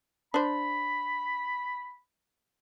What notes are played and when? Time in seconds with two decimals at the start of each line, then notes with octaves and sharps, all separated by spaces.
0.34 D4 C5 B5